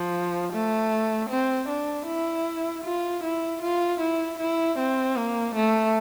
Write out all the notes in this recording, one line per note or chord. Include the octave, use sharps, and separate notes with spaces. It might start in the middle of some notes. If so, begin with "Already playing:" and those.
Already playing: F3
A3
C4
D4
E4
F4
E4
F4
E4
E4
C4
A#3
A3